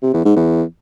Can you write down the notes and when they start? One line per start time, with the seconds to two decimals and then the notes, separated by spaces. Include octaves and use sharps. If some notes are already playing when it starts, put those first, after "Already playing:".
0.03 C3
0.14 E2
0.25 G#2
0.36 E2